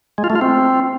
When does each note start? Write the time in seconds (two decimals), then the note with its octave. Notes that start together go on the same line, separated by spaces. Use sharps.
0.18 G#3
0.24 F4
0.30 A3
0.36 F4
0.41 C4